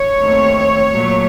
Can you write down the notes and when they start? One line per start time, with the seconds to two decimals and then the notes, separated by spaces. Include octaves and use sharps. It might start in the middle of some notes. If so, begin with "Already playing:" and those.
Already playing: C#5
0.22 D#2 D#3 A3 C4
0.94 A#2 F#3 A3